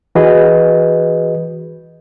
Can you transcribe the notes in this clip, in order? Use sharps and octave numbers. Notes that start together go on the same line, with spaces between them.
E3 F#4 G#4 B4 D#5